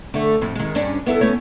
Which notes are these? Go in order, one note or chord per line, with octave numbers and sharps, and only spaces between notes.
D3 A3
F2 A2
D#3 G#3
G2 C#4 D4
B3 E4 A4
A3 B3 C#4